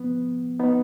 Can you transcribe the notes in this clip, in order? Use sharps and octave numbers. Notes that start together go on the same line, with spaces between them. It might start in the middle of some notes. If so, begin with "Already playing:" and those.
Already playing: F3 B3
B3 D#4